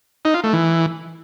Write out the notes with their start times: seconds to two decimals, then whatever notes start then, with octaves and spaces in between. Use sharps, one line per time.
0.25 D#4
0.34 F4
0.44 A3
0.53 E3